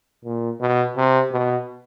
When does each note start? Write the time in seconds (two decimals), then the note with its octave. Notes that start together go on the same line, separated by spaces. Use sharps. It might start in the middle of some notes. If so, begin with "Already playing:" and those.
0.25 A#2
0.61 B2
0.97 C3
1.32 B2